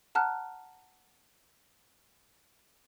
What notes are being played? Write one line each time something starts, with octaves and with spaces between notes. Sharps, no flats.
F#5 A5 A#5 F6 F#6